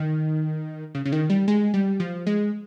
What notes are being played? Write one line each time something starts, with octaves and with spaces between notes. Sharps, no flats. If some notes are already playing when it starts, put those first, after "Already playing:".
Already playing: D#3
C#3
C#3
D#3
G3
G#3
G3
F3
G#3